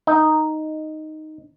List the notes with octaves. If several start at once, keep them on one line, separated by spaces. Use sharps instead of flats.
D#4